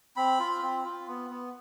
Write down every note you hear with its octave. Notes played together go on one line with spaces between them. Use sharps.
C4 B5
F4
C4
F4
B3
B3